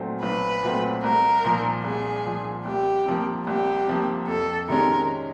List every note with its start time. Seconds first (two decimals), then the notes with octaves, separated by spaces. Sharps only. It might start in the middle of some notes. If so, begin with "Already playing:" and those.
Already playing: A#2 F#3 A3 C4
0.22 B1 B4
0.63 A#2 F#3 A3 C4
1.04 C2 A#4
1.44 A#2 F3
1.84 C2 G#4
2.25 A#2 F3
2.65 C2 G4
3.06 C3 F3 A#3
3.47 C2 G4
3.87 C3 F3 A#3
4.27 F2 A4
4.68 C3 D#3 G#3 C#4 A#4